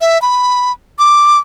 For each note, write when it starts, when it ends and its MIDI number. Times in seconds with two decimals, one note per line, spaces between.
0.01 0.20 76
0.22 0.72 83
0.99 1.39 86